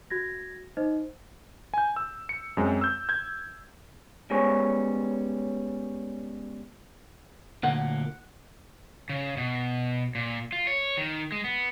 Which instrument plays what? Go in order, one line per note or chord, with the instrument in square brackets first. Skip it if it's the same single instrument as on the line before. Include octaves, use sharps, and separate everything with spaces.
[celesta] F#4 G#6 A#6
D#4 C5 D#5
[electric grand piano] G#5 G6
E6
C#7
F#2 G#3 C4
E6 G6
G6 G#6
[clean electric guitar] G3 G#3 B3 C#4 C5 C#5
[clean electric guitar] D2 A#2 A#3 [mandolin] F#5
[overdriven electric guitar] C#3
B2
A#2
F4
C#5
D#3
G#3
B3